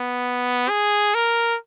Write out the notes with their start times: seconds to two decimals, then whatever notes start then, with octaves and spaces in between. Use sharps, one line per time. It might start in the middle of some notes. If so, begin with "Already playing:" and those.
Already playing: B3
0.69 G#4
1.14 A#4